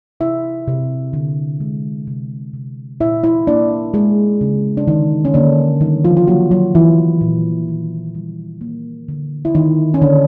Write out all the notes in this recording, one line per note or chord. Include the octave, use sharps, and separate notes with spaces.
C3 E4 E5
C3
D3
G#3
C3
C3
A#2 E4 E5
E4 E5
A#3 D4 D5
G#3 A#3 G#4
C#3
D4
D3 D#3 D#4
C#4
D3 A#3 D4
D#3 G3 D#4
F3 F4
F4
F#3 A#3 F#4
F#3 F#4
E3 F#3 E4
A#2
D#3
G3
A#3
D3
E4
D#3 A#3 D#4
C#4
D3 A#3 D4